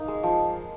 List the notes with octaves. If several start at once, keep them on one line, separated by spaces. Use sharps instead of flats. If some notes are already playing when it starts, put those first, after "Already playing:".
Already playing: A#3 D#4
G#3
F3